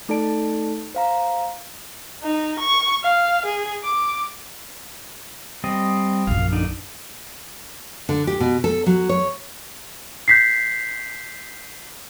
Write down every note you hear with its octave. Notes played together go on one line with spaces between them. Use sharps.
A3 D#4 A4 D5 A5 D7
C5 F5 A#5
D#4
C#6
F5
G#4
D6
G3 C4 D#5
A#1 F#2 F5
D3 D4 D#4
D3
G4
B2
A4
F#3
C#5
G6 B6 C7